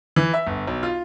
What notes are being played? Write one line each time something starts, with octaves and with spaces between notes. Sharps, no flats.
E3
E5
G1
B1
F4